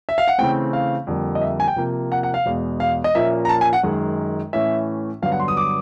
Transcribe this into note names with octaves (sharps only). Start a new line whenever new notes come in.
E5
F5
F#5
C#3 E3 A3 C4 G5
F5
F2 D3 G3 A#3
D#5
E5
G#5
G5
C3 F3 A#3
F#5
F#5
F5
E2 B2 G#3
F5
D#5
A#2 F3 A#3 C#4 E5
A#5
A5
G#5
F#5
F#2 D#3 G#3
A2 E3 A3 C#4 E5
G2 D3 F#3 B3 F5
F#5
C6
D#6
D6